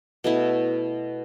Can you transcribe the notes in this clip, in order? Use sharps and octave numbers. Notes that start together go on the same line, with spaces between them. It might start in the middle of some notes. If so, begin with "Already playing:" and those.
B2 A3 E4